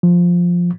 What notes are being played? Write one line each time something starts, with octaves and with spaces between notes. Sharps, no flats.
F3